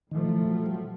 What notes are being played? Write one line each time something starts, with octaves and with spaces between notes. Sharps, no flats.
A#2 D#3 F3 A3
E3
F#3
G3
F#3